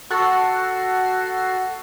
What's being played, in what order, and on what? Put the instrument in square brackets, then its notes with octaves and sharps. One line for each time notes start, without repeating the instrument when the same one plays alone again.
[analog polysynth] F#4 A4 C7